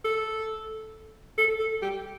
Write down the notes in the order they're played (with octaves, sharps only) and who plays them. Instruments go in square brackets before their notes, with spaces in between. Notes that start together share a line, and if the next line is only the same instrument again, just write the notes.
[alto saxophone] A4
A4
A4
G4